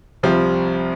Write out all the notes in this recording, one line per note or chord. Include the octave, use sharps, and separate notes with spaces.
C2 C3 F3 G3